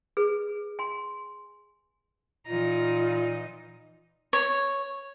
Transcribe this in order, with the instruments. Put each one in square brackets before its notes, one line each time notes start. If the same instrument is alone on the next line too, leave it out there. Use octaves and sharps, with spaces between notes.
[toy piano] G#4 B4
G#5 C6
[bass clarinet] A#2 [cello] E3 D#4 [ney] F4 [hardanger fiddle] A#5
[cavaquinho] C#5